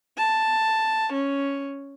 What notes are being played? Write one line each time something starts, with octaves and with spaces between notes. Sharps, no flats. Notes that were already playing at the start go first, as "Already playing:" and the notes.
A5
C#4